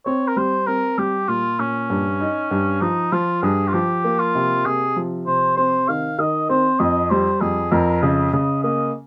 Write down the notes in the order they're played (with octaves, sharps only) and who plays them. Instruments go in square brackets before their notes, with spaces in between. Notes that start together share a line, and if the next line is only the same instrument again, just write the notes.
[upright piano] C4 [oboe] C#5
[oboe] A#4
[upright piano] G3 [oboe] C5
[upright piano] C4 [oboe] A#4
[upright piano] G3 [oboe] G4
[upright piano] A#2 [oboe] F4
[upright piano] A#2 [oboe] C#4
[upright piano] G2
D#4
G2
[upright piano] F3 [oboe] D#4
[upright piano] F3 [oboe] F4
[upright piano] G2 [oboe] G#4
[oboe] F4
[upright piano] F3 [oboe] G4
[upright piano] A#3
[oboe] F4
[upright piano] C3
[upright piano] C3 [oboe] G#4
[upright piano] F3
[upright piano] C3 [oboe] C5
[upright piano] C4 [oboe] C5
[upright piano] D#3 [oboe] F5
[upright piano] D#3 [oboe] D#5
[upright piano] C4 [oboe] C5
[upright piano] F2 [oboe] D#5
[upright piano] G3 [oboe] C5
[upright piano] F2 [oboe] G#4
[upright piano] F2 [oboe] A#4
[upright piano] C#3 [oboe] D#5
[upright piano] C#3 [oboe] D#5
[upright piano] A#3 [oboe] D#5